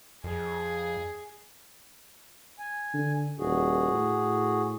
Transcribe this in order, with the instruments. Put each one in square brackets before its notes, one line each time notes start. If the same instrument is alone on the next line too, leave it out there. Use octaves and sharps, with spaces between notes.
[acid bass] F2 [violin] G#4
[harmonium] G#5
[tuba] D3
[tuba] D#1 [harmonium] F#4 G#4
[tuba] A2